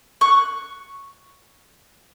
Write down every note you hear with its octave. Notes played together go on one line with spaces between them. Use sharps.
C#6 F#6